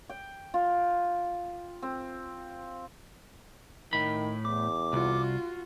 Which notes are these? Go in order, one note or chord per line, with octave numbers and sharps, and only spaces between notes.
G5
F4
C4
A2 D#3 B5
E2 D6
C2 F4 F#4